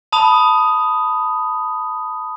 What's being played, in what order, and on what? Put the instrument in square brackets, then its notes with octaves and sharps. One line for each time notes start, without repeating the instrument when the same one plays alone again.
[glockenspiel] A5 B5 D#6 F7